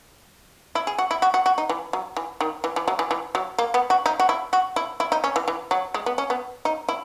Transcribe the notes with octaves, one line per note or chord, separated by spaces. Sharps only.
E4
G#4
F#4
E4
F#4
F#4
F#4
D#4
E3
F#3
E3
D#3
E3
E3
F#3
E3
E3
F#3
A#3
B3
F#4
D#4
F#4
E4
F#4
E4
E4
D#4
C#4
E3
E3
F#3
G#3
B3
C#4
B3
D#4
E4